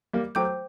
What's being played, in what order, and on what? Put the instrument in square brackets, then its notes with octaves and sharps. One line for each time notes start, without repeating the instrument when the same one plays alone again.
[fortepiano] G3 A#3
[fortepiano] F#3 A3 [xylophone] C5 G5 D6 G6